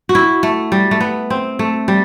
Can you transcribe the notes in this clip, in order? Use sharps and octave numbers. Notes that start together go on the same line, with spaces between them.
F#4
E4
A3
G3
A3
B3
C4
A3
G3